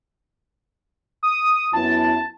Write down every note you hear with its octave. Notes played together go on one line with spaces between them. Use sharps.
D#6
F#2 B3 E4 A5